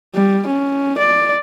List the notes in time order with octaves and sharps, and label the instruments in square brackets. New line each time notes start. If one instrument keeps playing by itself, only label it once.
[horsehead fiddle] G3
C#4
D5